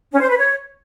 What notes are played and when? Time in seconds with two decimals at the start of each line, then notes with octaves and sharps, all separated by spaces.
0.11 C#4
0.20 C5
0.28 B4
0.37 C#5